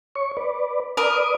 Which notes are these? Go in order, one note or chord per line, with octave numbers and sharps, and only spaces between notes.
C#5 C#6
B4 D5
A#4 B4 D5 D#6